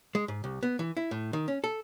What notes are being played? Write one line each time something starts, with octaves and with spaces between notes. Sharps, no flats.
G#3
G#2
C2
B3
E3
E4
A2
D#3
C#4
A4